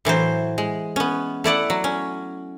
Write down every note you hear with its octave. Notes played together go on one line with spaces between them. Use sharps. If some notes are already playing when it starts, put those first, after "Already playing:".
A2 E3 F#3 C5
G#3
B3 C#4
A3 E4 D5 F#5
F#3
C#4